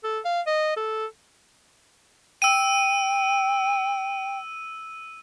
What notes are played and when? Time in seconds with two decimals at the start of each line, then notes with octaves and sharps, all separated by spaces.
0.04 A4
0.25 F5
0.47 D#5
0.77 A4
2.42 G5 E6 D#7